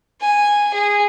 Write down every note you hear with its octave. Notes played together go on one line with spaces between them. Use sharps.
G#5
G#4